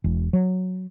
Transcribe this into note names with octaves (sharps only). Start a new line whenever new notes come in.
E1
F#3